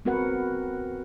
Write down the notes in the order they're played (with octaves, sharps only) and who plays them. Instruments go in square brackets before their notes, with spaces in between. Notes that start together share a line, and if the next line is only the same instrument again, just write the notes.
[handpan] B3 C4 F#4 A#4 B4 F#5